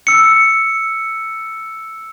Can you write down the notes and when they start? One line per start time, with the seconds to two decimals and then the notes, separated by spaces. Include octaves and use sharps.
0.07 E6 C#7